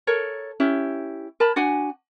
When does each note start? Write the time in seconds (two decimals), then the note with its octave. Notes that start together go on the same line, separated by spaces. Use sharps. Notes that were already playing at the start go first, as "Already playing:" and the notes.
0.07 A4 A#4 C#5
0.60 C#4 E4 G4
1.40 A#4 A5 B5
1.56 D4 F#4 F#5 G#5